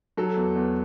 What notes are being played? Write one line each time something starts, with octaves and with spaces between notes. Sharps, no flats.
F#3 A4
E2
E2